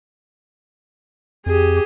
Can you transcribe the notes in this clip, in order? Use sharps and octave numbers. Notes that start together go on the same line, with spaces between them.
F2 G4 G#4